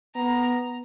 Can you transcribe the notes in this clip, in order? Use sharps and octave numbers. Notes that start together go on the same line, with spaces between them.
B3 A#5